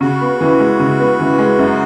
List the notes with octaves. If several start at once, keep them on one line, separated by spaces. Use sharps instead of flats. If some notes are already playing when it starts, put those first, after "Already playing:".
C#3 F#4
B3
E3
G#3
C#3
B3
E3
G#3
F#2